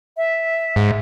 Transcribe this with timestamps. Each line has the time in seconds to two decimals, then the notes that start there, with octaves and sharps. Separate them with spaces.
0.17 E5
0.76 G#2